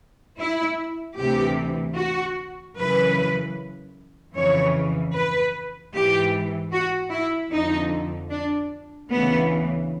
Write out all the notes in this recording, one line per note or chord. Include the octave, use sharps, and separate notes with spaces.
E4
D2 C3 E3 G4
F#4
F#2 C#3 E3 B4
F2 C#3 E3 C#5
B4
G#2 E3 G4
F#4
E4
F2 D3 D#4
D4
D2 C#3 E3 B3